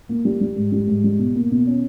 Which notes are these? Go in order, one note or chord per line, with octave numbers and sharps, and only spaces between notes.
A#3
G3
G3
G#2
G3
G#2
G3
B2
A#3
B2
C#4